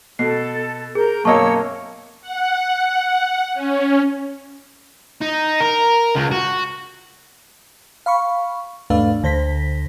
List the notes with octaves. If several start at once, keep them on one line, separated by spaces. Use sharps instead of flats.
B2 A4 C7
G#4 A#4 G6
F#2 B2 A#3 C#5 D#5 A5 C#6 E6
F#5
C#4
D#4
A#4
C#2
F#4
F5 B5 C#6
E2 G#2 A3 D4 B4 F5
D2 D3 C5 A#6 B6